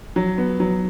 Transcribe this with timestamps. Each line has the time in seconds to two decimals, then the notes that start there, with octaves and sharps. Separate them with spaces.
0.16 F#3
0.38 B3
0.60 F#3